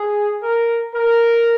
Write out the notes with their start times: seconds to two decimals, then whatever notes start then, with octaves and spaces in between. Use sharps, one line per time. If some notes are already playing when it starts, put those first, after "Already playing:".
Already playing: G#4
0.43 A#4
0.95 A#4